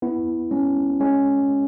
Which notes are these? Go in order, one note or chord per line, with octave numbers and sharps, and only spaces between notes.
B3 E4
G#3 C#4
G#3 C#4